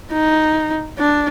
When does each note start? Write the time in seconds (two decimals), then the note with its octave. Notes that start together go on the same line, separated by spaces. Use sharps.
0.12 D#4
0.99 D4